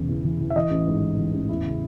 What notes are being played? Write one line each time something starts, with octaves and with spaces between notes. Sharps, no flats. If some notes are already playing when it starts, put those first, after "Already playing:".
Already playing: E1 E2 C#3
E3
E3
E3
E5
E3 D#5
A1
G#2
E3
E3
A1
E2 E4
C#3